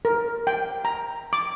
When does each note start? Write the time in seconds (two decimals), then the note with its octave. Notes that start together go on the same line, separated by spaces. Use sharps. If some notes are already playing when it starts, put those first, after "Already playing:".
0.05 A#4
0.47 G5
0.85 A#5
1.33 D6